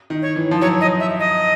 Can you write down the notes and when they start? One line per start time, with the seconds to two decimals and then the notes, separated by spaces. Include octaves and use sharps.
0.10 D#3
0.22 C#5
0.36 E3
0.51 F3
0.61 F#3 C#5
0.81 D#5
1.00 E5
1.20 D#5